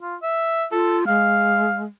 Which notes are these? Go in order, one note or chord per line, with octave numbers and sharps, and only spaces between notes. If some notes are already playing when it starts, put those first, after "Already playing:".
F4
E5
F4 A4
G#3 F5